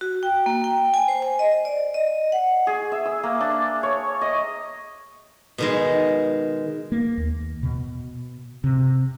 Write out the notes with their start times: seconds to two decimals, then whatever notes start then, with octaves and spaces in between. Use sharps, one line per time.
0.01 F#4
0.23 G5
0.46 A#3
0.64 G5
0.94 G#5
1.08 C5
1.23 G#5
1.39 D#5
1.65 D5
1.94 D#5
2.32 F#5
2.67 G#4
2.92 E5
3.05 E6
3.23 A#3
3.40 D4
3.83 C#5
4.21 D#5
5.58 B2 D#3 G#3
6.92 A#3
7.17 D#2
7.63 B2
8.64 C3